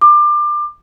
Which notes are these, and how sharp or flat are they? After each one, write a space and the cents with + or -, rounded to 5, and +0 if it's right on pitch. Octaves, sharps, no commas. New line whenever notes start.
D6 +25